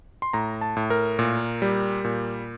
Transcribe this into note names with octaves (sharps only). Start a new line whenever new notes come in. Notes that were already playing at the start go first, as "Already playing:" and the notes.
C6
A2 A#5
A5
A2
A#4
A#2
G3
A#2